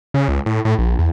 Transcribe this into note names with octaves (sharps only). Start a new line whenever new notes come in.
C#3
C#2
A2
A2
A#1
E2